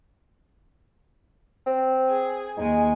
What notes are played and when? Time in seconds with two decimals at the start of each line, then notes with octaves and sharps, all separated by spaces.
1.66 C4
2.09 G#4
2.57 D#2 G#3 D#4 G#5